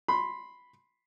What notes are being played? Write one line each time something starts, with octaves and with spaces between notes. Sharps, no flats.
B5 C6